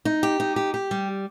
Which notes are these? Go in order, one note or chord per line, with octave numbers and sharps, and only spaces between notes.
D#4
G4
D#4
G4
G4
G3